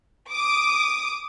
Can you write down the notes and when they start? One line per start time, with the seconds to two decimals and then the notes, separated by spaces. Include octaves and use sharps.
0.31 D6 D#6